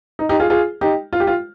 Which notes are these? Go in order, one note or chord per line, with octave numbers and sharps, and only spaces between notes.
D#4
D#4 G4
F4 G#4
F4 G#4
D#4 G4
F4
G4
F4